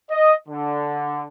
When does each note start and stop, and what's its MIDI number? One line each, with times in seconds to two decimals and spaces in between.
0.10 0.34 75
0.49 1.25 50